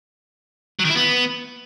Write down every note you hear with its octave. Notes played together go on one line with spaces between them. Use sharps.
F#3
D#3
E4
B3